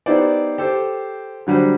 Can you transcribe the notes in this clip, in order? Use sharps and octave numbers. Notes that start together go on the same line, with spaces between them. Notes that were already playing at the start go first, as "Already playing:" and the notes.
B3 D#4 E4 G4 C5 D5
G4 A4 C5
D3 F#3 G3 D4 C5